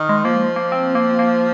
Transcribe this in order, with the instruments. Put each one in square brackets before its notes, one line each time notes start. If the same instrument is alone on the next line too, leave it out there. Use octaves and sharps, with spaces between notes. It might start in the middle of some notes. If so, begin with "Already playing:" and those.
Already playing: [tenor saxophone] D#3
[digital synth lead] G#3
[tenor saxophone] F3 [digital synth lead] A#3
[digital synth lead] A#3
C4
A#3
A#3